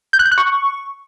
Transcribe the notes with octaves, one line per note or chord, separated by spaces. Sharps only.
G6
F#6
G6
F#6
C#6